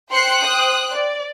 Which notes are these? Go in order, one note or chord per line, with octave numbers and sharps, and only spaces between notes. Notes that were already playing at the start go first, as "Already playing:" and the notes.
C5 G5 C6 F#6 C7 C#7
D#6
D5